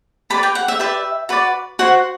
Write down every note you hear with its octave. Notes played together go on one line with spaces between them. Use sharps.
G4 B4 D5 B5
G5
F#5
E5
G4 B4 D5 E5
F#4 B4 D5
F#4 C5 F#5